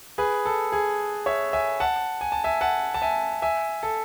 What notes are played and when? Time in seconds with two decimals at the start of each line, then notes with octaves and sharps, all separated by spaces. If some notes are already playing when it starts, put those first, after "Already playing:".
0.18 G#4 B4
0.46 A4
0.72 G#4
1.26 C#5 E5
1.53 E5 G#5
1.80 F#5 A5
2.21 G#5
2.32 A5
2.44 E5 G#5
2.61 F#5 A5
2.94 A5
3.02 E5 G#5
3.42 E5 G#5
3.83 A4